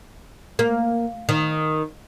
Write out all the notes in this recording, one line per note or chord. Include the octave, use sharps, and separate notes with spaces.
A#3
D#3